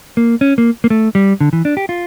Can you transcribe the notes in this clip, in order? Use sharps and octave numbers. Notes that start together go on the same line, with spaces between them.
A#3
C#4
A#3
A#3
A3
G3
D3
E3
D4
G4
F4